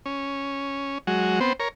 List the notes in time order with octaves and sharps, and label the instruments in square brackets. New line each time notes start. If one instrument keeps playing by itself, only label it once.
[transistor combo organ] C#4
F#3 G#3 F#4
B3 C4 C5
A#4 C#5